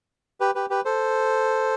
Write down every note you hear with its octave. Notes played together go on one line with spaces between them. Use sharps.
G4 B4
G4 B4
G4 B4
A4 C5